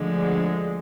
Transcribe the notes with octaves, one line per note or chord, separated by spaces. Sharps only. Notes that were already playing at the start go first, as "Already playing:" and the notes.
Already playing: D2 D3 F3 G#3